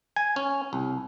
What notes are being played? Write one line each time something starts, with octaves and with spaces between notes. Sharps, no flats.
G#5
C#4
C2